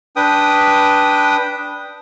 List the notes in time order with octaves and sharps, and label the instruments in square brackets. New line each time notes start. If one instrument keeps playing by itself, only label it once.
[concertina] D4 B4 G5 D#6